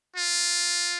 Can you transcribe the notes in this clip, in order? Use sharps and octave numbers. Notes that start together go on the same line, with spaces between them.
F4